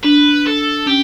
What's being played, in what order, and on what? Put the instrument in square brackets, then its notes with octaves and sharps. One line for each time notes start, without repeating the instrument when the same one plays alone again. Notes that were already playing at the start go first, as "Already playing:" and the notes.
[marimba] D4 [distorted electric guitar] B4
[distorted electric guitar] A4
[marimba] C#4 [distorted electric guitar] G4